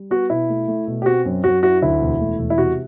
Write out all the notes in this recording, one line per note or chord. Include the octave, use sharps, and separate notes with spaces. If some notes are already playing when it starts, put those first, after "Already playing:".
Already playing: G3
B3 F#4
B2 E4
A3
A3
B2
G4
C4 F#4
F#2
F#2 F#4
E4 F#4
D2 E4
E1
A3
E1
E4
C3 F#4